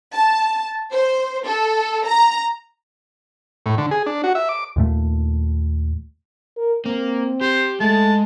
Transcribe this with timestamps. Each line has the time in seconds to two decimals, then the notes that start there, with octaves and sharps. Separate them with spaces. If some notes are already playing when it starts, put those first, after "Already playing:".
0.13 A5
0.92 C5
1.46 A4
2.06 A#5
3.66 A2
3.78 D3
3.91 G#4
4.06 D4
4.24 F#4
4.35 E5
4.49 D6
4.76 D#2 A#2 A3
6.57 A#4
6.86 A#3 C4
7.41 G4 C5
7.80 G#3 A3 A5